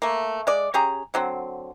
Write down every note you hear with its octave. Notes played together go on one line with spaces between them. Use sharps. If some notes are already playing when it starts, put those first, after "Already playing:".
A3 A#3
G#3 D5
C#4 G4 G#4 A#5
D3 F#3 C4